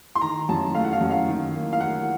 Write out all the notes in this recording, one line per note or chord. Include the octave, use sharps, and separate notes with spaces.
C6
D#3 A#5
F#2 A5
A3 F5
F#5
F5
F#2
F5
D#3
A#3
F5
A#3 F#5